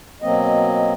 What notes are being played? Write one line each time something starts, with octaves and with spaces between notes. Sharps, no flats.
B2 F#3 A#3 C4 D#5